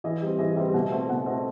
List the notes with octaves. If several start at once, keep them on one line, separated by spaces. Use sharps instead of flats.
E3 D#5
G3 C4
E3 D#5
G3 C4 E5
B2 F#5
A3 C4 E5
B2 F#5
A3 C4 D#5